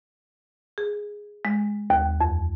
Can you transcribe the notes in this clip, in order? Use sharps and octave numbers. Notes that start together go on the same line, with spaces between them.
G#4
G#3
D#2
F2